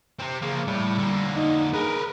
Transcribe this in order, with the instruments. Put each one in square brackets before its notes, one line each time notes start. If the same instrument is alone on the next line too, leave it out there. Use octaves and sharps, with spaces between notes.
[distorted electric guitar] C3 C4
[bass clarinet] C#3 [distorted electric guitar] F3 A#3
[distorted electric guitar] A2 [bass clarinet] G3
[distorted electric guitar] D3 A#3
[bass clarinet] D#4
[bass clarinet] G#4 [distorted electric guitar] A#4 B4